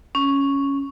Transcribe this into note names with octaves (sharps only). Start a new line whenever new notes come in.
C#4